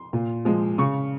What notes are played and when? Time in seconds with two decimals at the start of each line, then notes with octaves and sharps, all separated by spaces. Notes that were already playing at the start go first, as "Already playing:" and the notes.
Already playing: C6
0.13 A#2
0.45 F3 G#3
0.78 C#3 C#6